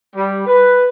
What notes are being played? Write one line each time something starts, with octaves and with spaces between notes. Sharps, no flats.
G3
B4